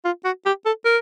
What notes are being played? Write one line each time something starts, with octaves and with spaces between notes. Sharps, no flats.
F4
F#4
G4
A4
A#4